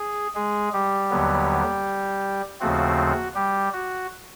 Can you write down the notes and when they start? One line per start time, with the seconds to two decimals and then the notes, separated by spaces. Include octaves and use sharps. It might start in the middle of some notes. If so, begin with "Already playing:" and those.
Already playing: G#4
0.35 G#3 G#4
0.73 G3 G4
1.11 D#2 D3 F#3 B3
2.60 D#2 C#3 F3 A3 C4 F#4
3.35 G3 G4
3.73 F#4